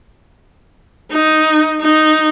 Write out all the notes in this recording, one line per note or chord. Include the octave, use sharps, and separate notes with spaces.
D#4
D#4